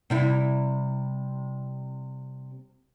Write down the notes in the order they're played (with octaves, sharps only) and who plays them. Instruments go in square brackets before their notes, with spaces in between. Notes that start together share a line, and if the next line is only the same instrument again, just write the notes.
[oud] C3 G3 E4